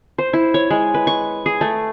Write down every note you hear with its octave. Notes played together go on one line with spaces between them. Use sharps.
C5
E4
C#5
G#3
B4
C#6
G#4
A3